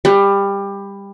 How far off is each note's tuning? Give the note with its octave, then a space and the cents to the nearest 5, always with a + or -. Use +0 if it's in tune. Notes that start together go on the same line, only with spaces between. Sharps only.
G3 +20